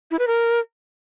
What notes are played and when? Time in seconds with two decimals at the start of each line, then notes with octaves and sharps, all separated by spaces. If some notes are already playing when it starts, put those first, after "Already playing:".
0.11 E4
0.19 B4
0.27 A#4